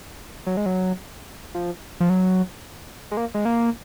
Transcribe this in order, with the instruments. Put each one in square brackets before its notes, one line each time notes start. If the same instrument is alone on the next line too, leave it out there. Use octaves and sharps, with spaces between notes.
[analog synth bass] F#3
G#3
F#3
F3
F3
F#3
G#3
A#3
G#3
A#3